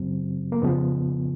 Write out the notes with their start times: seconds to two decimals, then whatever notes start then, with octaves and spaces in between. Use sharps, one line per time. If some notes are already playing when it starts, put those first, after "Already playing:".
Already playing: F#2 C#3 F#3 C4
0.52 A#3
0.62 F2 C#3 F3 B3